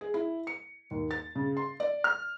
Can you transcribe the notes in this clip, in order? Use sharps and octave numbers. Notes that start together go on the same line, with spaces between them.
G#4
E4
C#7
D#2
A6
C#3
C6
D5
F6